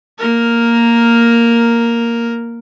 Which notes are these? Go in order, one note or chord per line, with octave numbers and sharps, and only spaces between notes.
A#3 A#4